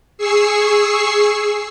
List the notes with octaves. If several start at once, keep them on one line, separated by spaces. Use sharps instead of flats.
G#4 C#6 E6 C7